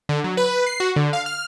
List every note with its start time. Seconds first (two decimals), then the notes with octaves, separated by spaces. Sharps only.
0.09 D3
0.24 F#3
0.37 B4
0.66 C7
0.80 F#4
0.96 D3
1.13 F5
1.26 F6